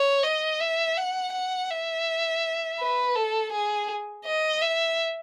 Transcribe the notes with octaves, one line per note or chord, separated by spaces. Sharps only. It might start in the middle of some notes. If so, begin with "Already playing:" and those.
Already playing: C#5
D#5
E5
F#5
F#5
E5
B4
A4
G#4
D#5
E5